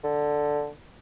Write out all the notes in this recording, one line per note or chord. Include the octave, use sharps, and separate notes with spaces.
D3